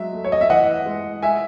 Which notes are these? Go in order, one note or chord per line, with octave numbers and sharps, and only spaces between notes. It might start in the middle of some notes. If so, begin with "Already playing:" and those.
Already playing: F#3 G#3 E5
A3
C#5
D#5
E5
E3 D#5 F#5
G#3
G#3 E5 G#5